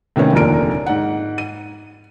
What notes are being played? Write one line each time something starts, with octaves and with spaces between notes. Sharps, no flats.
A2 C3 D#3 B3 C#4
F1 D#2 A#2 D3 A#4 D7
G#2 F#5
D#7